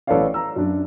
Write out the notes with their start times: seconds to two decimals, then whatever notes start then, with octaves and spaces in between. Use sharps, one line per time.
0.07 A1 A4 B4 C#5 D5 F5
0.34 A#5 E6
0.56 F#2 D4